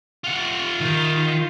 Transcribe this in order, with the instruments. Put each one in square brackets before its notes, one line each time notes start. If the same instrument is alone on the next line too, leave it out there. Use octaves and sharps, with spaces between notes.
[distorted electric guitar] F4 F#5
[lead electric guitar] D#3